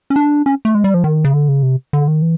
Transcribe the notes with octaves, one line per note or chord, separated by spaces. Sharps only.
C#4
D4
C#4
A3
G#3
G3
F3
D#3
C#3
D3
C#3
C3
D3
D#3
E3